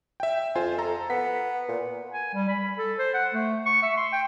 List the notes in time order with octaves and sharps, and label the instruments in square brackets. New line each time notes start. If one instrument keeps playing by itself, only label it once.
[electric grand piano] E5 G5
[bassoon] F2 [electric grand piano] F4 C5 G#5
[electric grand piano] A4 A#5
[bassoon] B3 [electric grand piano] B6
[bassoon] A#2
[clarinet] G#5
G3
B5
A4
C5
F#5
A3
C#6
E5
C6
G5